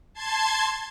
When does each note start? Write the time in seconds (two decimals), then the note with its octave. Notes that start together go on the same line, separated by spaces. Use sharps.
0.13 A5 C6 G#6